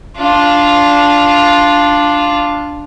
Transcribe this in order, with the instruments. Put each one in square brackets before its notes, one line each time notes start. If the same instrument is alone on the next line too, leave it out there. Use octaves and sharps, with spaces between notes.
[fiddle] D4 F4